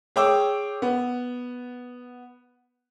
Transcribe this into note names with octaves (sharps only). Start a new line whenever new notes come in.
G#4 C#5 G5 D6 E6
B3